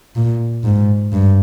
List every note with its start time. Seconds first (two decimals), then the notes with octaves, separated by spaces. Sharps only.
0.16 A#2
0.64 G#2
1.12 G2